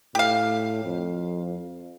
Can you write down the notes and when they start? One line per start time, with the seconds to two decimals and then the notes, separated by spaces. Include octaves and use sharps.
0.15 A2 G4 F5
0.84 F2